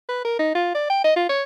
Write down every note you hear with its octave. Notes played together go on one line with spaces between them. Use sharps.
B4
A#4
D#4
F4
D5
G5
D#5
F4
C#5